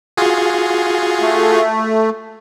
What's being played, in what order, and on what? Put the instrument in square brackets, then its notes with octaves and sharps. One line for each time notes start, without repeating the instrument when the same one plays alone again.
[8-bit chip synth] F4 F#4 G#4
[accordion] A3